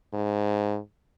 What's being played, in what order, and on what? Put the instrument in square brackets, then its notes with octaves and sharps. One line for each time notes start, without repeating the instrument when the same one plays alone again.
[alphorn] G#2